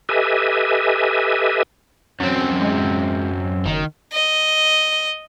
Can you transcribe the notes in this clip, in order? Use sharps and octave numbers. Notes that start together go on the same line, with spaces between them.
G4 A4 B4 D#5 E5 G#5
F#2 F#3 C4
G#3
F#1 D#3
D#5